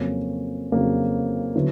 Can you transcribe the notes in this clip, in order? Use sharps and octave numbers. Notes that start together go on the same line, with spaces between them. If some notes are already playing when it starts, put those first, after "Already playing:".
Already playing: F2 C#3 F#3 A#3 C#4
F2 C#3 F#3 A#3 C#4
D3 F#3 B3 E4